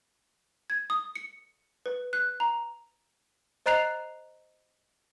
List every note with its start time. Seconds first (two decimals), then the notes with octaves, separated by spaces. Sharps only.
0.70 G#6
0.90 D#6
1.15 C#7
1.86 B4
2.13 F#6
2.40 A#5
3.66 C5 D#5 A#5 F#6 C7 F7